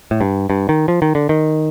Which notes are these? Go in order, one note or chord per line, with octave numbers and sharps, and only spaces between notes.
A2
G2
G2
D#3
F3
D#3
D3
D#3